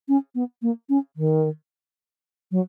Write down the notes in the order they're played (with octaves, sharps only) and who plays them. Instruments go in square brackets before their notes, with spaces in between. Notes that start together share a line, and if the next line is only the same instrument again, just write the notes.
[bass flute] C#4
B3
A#3
C#4
D#3
F#3